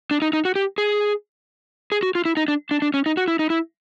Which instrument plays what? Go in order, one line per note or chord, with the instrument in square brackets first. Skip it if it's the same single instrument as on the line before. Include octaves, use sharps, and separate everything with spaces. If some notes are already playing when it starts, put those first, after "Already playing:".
[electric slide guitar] D4
D#4
D#4
F#4
G4
G#4
G#4
F#4
F4
E4
D#4
D4
D4
D4
C#4
D#4
F#4
E4
D#4
E4